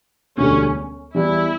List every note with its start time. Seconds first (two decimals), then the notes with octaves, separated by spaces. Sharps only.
0.37 E1 D2 D3 G3 C#4
1.14 E2 E3 G3 E4